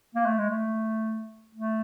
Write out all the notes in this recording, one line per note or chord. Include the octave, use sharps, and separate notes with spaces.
A#3
A3
G#3
A3
A3